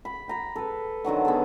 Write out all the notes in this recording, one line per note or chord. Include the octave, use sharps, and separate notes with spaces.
B5
G5 A#5 B5
A4 B4
D3 D#3 F#3 F#5
B3 G#4 A4